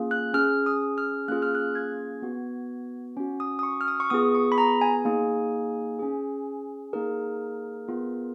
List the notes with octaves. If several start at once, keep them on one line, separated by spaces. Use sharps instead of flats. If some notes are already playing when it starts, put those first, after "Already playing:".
Already playing: A#3 C#4 F4 G#4
F#6
C#4 G#4 F6
D#6
F6
A#3 C#4 F4 G#4 F#6
F6
F#6
G#6
B3 F#4
C#4 F#4
D#6
D#6
C#6
F6
D#6
C#6
B3 F4 G#4 D#6
C#6
B5
A#5
G#5
A#3 D#4 G#4
C#4 G#4
A#3 D#4 G#4 A#4
B3 F4 G#4